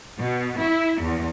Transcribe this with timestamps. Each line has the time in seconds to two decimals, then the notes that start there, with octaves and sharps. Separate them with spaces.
0.19 B2
0.62 E4
1.02 E2